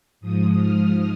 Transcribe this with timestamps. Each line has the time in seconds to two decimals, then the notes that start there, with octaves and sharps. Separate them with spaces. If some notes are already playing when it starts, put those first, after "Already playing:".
0.21 G#2 F3 D#6
0.56 F6